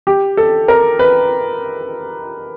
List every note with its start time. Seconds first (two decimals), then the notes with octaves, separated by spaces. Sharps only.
0.07 G4
0.37 A4
0.68 A#4
0.99 B4